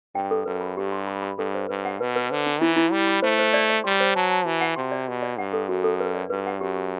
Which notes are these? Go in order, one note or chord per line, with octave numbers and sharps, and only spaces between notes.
G2 G5
A4
F#2 B4
B5
G2 G4
C6
B5
B5
G2 A4
C5
G2 B4
F#5
B2 B4
B4
D3 C5
D4
E3 E4
E4
G3 B5
B5
A3 C5
C5
D5
D5
G3 C6
C5
F#3 A5
A5
E3 F#4
F#5
C3 C6
D5
B2 G4
D5
G2 F#5
A4
F#2 F#4
A4
B4
D5
G2 B4
F#5
F#2 G4
G4